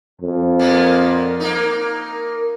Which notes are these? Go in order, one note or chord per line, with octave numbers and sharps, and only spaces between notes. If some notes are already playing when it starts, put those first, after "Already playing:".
F2
A#2 A#3 B3
A#3 D#4 A#4